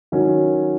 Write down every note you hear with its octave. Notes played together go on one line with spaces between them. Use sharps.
D#3 F#3 C#4